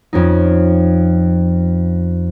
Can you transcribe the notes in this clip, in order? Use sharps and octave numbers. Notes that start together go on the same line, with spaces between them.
F2 C#4 D#4